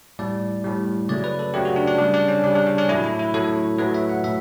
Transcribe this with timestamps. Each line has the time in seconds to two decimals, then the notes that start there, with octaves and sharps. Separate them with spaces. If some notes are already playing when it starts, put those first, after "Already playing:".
0.19 A2 G3 D5
0.64 A2 G3
1.09 C#3 F#3 A3 D5
1.24 B4
1.39 A4
1.54 C#3 F#3 A3 G4
1.65 F#4
1.76 D4
1.87 D4
1.98 C#3 G3 D4
2.14 D4
2.28 C#4
2.44 C#3 G3 D4
2.55 D4
2.67 C#4
2.78 D4
2.89 A2 F#3 A3 E4
3.04 E4
3.19 E4
3.34 A2 F#3 A3 A4
3.78 A2 F#3 A3 B4
3.94 E5
4.09 F#5
4.24 A2 E5